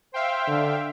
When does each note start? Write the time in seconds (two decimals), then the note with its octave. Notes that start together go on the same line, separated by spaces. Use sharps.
0.14 C5 E5 F5 G5
0.47 D3